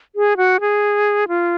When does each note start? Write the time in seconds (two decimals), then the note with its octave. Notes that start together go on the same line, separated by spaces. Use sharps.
0.16 G#4
0.37 F#4
0.60 G#4
1.28 F4